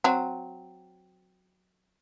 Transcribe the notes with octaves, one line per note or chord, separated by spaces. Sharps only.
F#3 C4